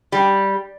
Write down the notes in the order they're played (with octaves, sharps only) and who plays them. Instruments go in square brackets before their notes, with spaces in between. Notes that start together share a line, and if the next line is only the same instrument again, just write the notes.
[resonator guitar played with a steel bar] G3